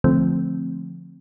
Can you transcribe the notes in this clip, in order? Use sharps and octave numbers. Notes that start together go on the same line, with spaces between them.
D3 F3 A3 C4